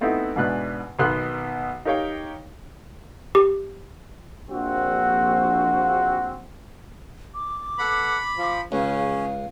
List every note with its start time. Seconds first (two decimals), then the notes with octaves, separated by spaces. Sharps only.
0.01 A3 B3 C4 D#4 E4 F#4
0.36 E2 G#2 B2 D4 B4 F#6
0.99 B1 B2 D#3 B3 C6 F#6
1.85 D#4 G4 A#4 C#5 F5 G5
3.35 G4
4.49 A#1 C4 F#4
7.35 D6
7.78 B3 A4 F#5 B5
8.38 F3
8.72 C#2 C#3 C#4 F5